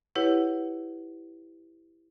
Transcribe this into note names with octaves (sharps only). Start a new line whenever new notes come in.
E4 G4 B4 C#5 F#5